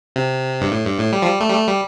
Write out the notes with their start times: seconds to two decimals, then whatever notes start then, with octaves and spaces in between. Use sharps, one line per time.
0.16 C3
0.61 G2
0.71 A2
0.85 G2
0.99 A2
1.12 G3
1.22 F3
1.26 G3
1.40 A3
1.49 G3
1.54 A3
1.68 G3